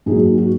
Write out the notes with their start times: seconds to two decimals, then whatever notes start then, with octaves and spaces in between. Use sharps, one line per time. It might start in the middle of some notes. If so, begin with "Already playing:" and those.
0.06 G#2 F#3 A#3 G#4
0.38 F#4